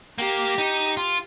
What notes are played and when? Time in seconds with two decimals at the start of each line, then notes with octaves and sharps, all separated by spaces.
0.18 A#3 G4
0.58 D#4
0.97 F4